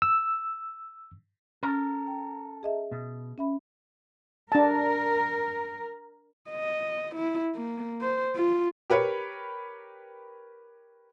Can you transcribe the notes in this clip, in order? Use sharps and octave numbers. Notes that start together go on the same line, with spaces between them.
E6
C#4 A4 A#4
G5
G#4 D#5 E5
B2
C#4 E5 B5
D4 A#4 A5
D#5
E4
A#3
C5
F4
G4 A#4 B4 C#5